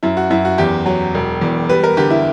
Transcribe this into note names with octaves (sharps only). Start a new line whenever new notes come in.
F#2 E4
F#4
F#2 E4
F#4
E2 G4
F#3
E1
E2
G3 B4
A#4
D3 G4
E4